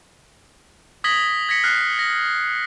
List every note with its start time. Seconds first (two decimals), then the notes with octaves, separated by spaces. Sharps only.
1.04 D#6 G#6 A#6 B6 F#7 G7
1.49 G#6 A#6 B6 C#7 F#7
1.64 F6 F#6 B6 C7
1.99 A#6